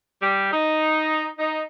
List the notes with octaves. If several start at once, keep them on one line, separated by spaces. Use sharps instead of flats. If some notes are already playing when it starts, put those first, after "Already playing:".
G3
D#4
D#4